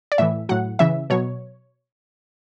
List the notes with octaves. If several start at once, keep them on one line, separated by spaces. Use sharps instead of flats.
D5
A2 E3 E5
A2 F#3 F#5
C#3 E3 E5
B2 F#3 C#5